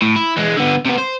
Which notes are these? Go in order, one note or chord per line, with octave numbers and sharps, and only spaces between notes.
A2
E4
E3 G#3
D3 B3
C3 B3
C5